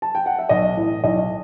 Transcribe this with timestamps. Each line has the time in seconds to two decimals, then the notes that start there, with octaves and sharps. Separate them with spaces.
0.02 A5
0.15 G5
0.26 F#5
0.39 E5
0.49 B1 D#5
0.77 A2 E3
1.04 B1 D#5